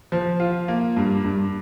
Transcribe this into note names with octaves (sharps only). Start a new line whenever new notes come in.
F3
F4
A#3
G2
G2